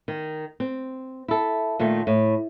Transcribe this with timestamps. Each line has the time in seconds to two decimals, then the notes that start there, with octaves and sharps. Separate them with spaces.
0.08 D#3
0.60 C4
1.28 E4 A4
1.79 A#2 D#3 A3
2.07 A2